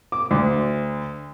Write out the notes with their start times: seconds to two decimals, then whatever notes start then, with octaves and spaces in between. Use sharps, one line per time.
0.12 D6
0.31 D2